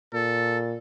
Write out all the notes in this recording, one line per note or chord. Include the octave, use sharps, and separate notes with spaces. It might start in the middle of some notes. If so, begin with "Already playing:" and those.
A#2 A4